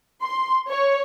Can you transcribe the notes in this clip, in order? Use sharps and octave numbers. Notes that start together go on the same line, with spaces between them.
C6
C#5